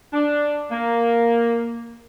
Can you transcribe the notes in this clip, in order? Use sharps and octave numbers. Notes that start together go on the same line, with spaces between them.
D4
A#3